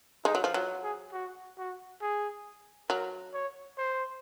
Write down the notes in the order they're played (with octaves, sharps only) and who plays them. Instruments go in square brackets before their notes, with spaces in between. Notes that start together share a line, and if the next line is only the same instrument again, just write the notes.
[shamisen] G#3 [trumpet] D#4
[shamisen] F#3
F3
[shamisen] F#3 [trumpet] F4
[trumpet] G#4
F#4
F#4
G#4
[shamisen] F#3 [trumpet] A#4
[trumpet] C#5
C5